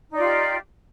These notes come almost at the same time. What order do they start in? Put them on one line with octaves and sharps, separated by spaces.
D#4 D5 F4 G4